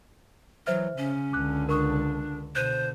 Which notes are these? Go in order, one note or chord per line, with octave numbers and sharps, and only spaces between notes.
E3 F#3 C5 E5 F6
C#3 C#4
C#2 D3 D6 F#6
D4 A#4 C#6 D#6
B2 D3 C5 F#6 G6 D#7